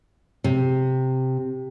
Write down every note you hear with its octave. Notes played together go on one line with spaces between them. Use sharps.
C3